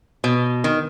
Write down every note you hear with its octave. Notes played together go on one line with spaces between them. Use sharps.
B2
D#3